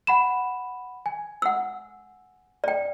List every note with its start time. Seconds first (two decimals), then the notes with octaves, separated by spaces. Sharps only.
0.07 F#5 B5 E7
1.06 G#5
1.42 F#5 E6
2.64 D5 G5